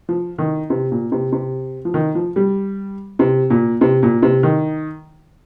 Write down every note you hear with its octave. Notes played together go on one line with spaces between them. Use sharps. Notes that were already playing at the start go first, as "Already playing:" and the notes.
F3
D#3
C3
A#2
C3
C3
F3
D#3
F3
G3
C3
A#2
C3
A#2
C3
D#3